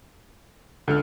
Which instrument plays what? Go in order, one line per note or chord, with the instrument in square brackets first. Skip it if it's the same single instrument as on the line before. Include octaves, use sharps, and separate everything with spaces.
[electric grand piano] C#2 A4 F6 [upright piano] D3